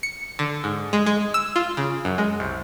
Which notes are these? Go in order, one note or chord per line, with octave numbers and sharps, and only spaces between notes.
C#7
D3
G#2
G#3
G#3
E6
F4
C#3
F#2
G#3
C2